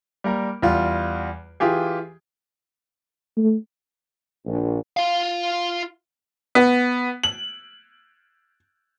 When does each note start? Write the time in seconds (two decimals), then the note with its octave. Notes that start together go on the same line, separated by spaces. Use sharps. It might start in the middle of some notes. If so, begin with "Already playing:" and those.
0.24 G3 A#3 A#4
0.62 E2 G3 F4
1.60 E3 F4 G4 G#4
3.37 A3
4.46 A#1
4.97 F4 F5
6.55 B3
7.24 F#7